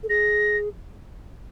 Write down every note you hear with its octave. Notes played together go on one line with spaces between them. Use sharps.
A4
G#4 A#6